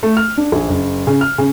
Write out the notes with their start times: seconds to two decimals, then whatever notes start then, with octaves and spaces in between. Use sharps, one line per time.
0.03 A3
0.17 F6
0.37 D4
0.52 A#1
0.69 F#1
1.07 C#3
1.21 F6
1.38 C#3